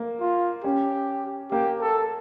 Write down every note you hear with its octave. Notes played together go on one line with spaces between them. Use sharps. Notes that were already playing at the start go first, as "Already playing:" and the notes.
Already playing: A#3
F4
C#4 G4
A#3 G4
A4